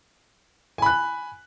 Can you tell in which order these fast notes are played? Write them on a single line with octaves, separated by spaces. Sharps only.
G#5 B5 F#6